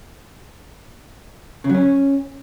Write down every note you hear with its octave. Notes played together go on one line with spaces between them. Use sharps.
C#3
F#3
C#4